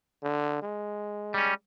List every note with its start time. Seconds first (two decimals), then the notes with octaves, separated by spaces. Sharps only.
0.23 D3
0.62 G#3
1.34 G3 C#4